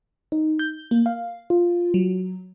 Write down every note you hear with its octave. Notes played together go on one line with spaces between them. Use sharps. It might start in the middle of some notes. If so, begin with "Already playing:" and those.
D#4
G6
A#3
F5
F4
F#3